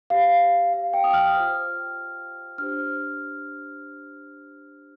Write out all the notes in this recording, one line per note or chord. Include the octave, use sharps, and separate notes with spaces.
G4 C5 F5
F5
G5
D#6
F6
F4 C5
D4 G4 C5 F6